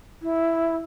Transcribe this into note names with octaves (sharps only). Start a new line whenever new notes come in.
E4